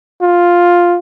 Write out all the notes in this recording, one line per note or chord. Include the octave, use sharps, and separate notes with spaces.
F4